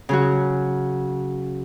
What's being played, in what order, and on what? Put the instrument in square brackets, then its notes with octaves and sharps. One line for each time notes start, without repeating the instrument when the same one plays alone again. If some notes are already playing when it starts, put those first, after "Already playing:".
[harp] C#3 F#3 F#4